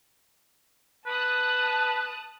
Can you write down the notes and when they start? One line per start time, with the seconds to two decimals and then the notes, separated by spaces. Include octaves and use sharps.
1.07 B4 A5 D#6 F#6